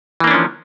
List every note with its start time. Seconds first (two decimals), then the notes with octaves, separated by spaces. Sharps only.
0.20 E3
0.24 A#3
0.27 D4
0.31 C#4
0.34 F3